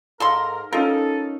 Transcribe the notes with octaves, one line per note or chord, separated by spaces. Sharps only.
G#2 A4 A#4 F5 C6
C#4 D#4 F4 A4 A#4